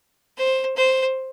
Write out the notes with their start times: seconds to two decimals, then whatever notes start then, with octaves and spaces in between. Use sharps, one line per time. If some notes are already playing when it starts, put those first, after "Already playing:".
0.37 C5
0.76 C5